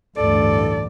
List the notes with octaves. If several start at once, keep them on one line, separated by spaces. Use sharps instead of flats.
A1 D2 G2 A4 D5